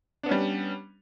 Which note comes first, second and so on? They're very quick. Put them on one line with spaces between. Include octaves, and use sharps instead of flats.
D4 B3 C#4 G3